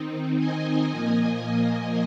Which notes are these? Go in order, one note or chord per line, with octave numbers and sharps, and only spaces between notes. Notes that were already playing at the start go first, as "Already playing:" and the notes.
Already playing: D#3 C4 D#4
D#5 G#5
A#2 F3 A#3
D#5 G#5